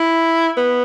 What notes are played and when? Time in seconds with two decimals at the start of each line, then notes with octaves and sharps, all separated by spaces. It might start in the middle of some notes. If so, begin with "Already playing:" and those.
Already playing: E4
0.57 B3